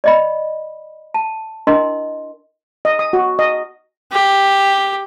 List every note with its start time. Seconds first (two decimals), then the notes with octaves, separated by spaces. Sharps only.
0.04 D5 D#5 B5
1.14 A5
1.67 D4 E4 A#4 D#5 C6
2.85 D#5
2.99 D#6
3.13 F#4
3.39 D#5
4.12 G4